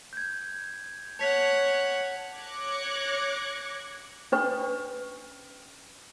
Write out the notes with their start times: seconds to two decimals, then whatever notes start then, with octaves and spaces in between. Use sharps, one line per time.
0.13 G6 G#6
1.19 C#5 F#5 A5 B6 F7
2.36 C#5 D6 F#6 G#6 A#6 C#7
4.32 C#4 D4 B4 C#6